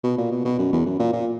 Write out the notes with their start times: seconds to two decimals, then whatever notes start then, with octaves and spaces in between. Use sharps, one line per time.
0.04 B2
0.18 A#2
0.31 B2
0.45 B2
0.59 F#2
0.73 E2
0.86 F#2
0.99 A#2
1.13 A#2